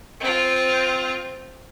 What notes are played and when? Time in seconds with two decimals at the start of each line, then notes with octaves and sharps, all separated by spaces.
0.20 C4 F4